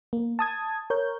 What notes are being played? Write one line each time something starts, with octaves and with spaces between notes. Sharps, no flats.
A#3
A5 D#6 G#6
A#4 C#5 G6